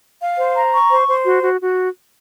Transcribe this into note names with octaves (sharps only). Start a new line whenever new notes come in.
F5
C5
A#5
C#6
C5
C5
F#4
F#4
F#4